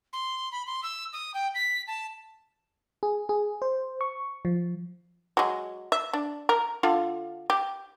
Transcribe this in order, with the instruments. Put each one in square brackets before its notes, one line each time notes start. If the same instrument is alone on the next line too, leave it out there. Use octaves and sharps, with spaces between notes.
[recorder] C6
B5
C6
E6
D#6
G5
B6
A5
[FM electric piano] G#4
G#4
C5
C#6
F3
[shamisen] F#3 G#3
E5
D4
A#4
D3 F4 F5
G4